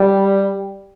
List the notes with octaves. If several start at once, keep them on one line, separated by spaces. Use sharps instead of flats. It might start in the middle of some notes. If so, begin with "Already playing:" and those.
Already playing: G3